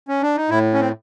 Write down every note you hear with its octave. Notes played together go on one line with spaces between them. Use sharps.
C#4
D4
D#4
A2 E4
C#4
C4